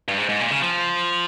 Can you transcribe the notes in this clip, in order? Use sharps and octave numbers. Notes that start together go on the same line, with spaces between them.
G2
G#2
G#2
A#2
C#3
F3